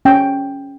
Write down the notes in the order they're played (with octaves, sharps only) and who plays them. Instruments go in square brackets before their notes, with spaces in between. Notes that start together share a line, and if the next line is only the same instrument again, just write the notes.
[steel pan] C#4 G5